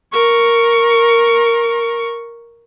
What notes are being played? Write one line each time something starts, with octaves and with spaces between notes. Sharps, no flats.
A#4 C#6